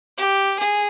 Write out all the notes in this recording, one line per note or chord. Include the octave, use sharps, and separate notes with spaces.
G4
G#4